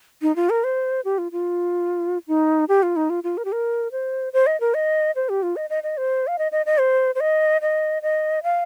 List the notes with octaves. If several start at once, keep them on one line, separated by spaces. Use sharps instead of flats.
D#4
F4
A#4
C5
G4
F4
F4
D#4
G4
F4
D#4
F4
F4
A#4
G4
A#4
C5
C5
D#5
A#4
D#5
C5
G4
F4
D#5
D#5
D#5
C5
F5
D#5
D#5
D#5
C5
C5
D#5
D#5
D#5
F5